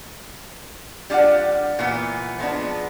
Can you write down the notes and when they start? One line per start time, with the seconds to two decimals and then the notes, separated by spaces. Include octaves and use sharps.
1.10 G3 D4 F4 D5 F#5
1.79 A#2 E3 B3
2.39 F3 G#3 B3 D4